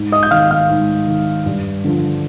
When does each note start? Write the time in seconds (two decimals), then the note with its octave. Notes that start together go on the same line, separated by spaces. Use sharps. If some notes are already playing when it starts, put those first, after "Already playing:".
Already playing: G#2
0.12 D#5 D#6
0.23 G6
0.31 D#3 F5 F6
0.51 F5 F6
0.70 G#2
1.08 D#3
1.46 G2
1.84 D3 F3